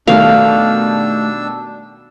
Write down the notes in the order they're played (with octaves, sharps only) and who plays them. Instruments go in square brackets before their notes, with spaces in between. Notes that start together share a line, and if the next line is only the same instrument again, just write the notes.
[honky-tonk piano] B2 D#3 G3 [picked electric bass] A3 [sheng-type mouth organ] D4 E6 [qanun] F5